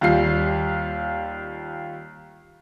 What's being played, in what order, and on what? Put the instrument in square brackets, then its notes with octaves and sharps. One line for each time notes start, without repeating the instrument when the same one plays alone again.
[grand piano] D#2 G3 F4 C7